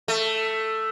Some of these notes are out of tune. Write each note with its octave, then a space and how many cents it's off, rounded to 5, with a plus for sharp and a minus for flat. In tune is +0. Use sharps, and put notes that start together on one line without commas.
A3 +5